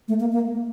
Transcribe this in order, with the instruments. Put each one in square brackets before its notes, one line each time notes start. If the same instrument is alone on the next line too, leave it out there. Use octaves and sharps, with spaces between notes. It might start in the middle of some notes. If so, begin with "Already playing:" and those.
[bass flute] A3
A#3
A#3